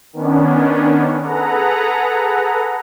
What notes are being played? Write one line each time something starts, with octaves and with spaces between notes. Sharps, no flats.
D#3 B3 C#4 D4
G#4 A4 B4 F#5 A#5